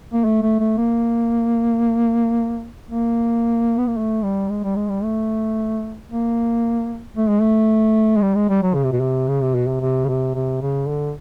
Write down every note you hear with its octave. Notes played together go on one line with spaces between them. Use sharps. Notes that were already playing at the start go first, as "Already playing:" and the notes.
A#3
A3
A3
A3
A#3
A#3
B3
A#3
A3
G3
G#3
G3
G#3
G3
A3
A#3
A3
G#3
A3
G#3
G3
G#3
G3
F#3
C#3
C3
B2
C3
C#3
C3
B2
C3
C3
C#3
C3
C3
C#3
D3